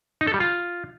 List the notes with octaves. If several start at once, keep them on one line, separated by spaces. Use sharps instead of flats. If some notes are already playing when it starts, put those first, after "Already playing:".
D#4
A4
G3
F4